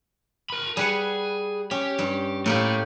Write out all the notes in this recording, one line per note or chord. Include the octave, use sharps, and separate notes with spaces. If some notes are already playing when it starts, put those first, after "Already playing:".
A#4 B5
G3 G#4 B4 F#5
C#4 G4
G2
A2 A3 A#3 G4 B5